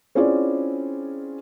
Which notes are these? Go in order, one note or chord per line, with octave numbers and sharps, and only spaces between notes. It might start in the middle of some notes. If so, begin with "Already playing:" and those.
C4 C#4 E4 F4 G#4 D5